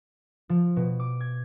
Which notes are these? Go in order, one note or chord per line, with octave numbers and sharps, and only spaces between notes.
F3
B2
D6
G#6